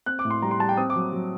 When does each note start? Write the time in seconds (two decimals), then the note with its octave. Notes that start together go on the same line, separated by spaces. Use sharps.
0.06 C4 F#6
0.19 D6
0.25 A2
0.30 C6
0.42 G3 A#5
0.51 C6
0.60 G3 A5
0.69 G5
0.77 C4 D#6
0.90 D6
0.96 F#3
1.13 F#3